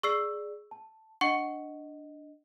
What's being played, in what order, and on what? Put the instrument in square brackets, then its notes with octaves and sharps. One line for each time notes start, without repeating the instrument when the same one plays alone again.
[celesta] G#4 D5 [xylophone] C#6 E6 C7
[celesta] A5
[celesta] D4 D#5 [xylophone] F#5 C#6 C#7